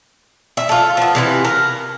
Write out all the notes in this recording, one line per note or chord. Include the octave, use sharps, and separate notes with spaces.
E5
F4 A4
F3 B3
C3 E3 F4
A#4